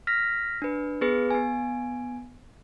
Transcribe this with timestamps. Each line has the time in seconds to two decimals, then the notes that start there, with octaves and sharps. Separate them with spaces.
0.07 F6 A#6 B6
0.62 D4 B4
1.01 B3 G#4 B4
1.30 B3 G#5